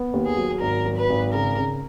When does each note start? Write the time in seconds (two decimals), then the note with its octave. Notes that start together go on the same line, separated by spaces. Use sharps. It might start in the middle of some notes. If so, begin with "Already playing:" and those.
Already playing: B3
0.14 D#2
0.26 G#4
0.37 F#3
0.61 G#1 A#4
0.85 F#3
0.97 B4
1.10 G#1
1.33 C#3 A#4
1.57 C#3